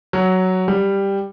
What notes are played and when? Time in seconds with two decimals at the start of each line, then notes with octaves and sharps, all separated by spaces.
0.13 F#3
0.68 G3